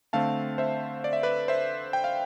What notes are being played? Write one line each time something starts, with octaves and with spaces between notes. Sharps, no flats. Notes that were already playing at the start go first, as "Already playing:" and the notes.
D3 A3 C4 F5 A5
C5 E5
D5
E5
B4 D5
C5 E5
G5
F5